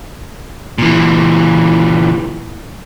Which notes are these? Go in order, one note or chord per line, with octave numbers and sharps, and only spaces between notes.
A#2 E3